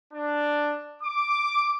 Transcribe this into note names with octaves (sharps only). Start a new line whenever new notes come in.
D4
D6